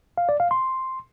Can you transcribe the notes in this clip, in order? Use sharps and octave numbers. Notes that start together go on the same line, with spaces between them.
F5
D5
F5
C6